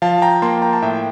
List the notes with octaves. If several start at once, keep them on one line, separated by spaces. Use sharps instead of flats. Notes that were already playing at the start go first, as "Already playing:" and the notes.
F3 F5 A5
A5
G5 A#5
A#3 A5 C6
G5 A#5
A5
A2 E5 G5